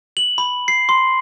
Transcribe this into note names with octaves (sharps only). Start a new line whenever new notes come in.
F#7
B5
C7
C6